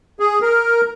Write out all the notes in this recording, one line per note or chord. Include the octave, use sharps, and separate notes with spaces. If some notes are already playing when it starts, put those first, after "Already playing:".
G#4
A#4